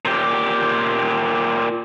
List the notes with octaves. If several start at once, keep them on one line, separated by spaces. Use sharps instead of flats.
A#2 G4